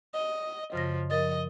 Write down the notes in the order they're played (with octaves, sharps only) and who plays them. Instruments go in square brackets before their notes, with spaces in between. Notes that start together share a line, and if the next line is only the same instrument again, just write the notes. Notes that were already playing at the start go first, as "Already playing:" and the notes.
[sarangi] D#5
[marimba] F#2 C#3 A#6 [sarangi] F3
[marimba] F3 A#4 A6 [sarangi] D#5